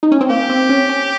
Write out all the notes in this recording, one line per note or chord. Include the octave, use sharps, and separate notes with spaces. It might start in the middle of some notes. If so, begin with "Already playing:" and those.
D#4
C#4
C4
A#3 G4
C4
C#4
C#4